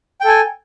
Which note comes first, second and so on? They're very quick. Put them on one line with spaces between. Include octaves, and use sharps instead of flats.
G5 A4 G#5